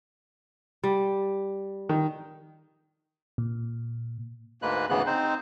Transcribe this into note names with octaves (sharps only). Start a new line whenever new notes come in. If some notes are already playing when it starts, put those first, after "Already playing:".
G3
D#3
A#2
D2 G#2 G#3 A#3 B4 F#6
D2 G#2 C#3 E3 B3 F#6
C4 D#4 C5